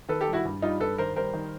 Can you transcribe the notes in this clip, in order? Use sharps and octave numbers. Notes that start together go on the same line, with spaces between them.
D#3 A4 B4
G4 A4
G3
E4 F#4
G2
G3 D#4 F4
G2 A4 B4
D#3 A#4 C5
G3 A#4 C5
D#3